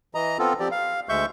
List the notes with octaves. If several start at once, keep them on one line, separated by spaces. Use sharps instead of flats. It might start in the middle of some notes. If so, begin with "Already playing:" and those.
E3 D#5 A#5
B3 C4 F4 A4
F3 C4 G4 D5
F5
D2 G#3 E5 C#6 G6